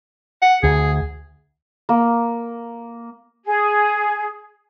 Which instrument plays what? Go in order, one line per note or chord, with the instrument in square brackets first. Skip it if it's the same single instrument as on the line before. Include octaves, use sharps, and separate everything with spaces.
[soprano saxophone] F#5
[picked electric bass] D2 [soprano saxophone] G#4
[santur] A#3
[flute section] G#4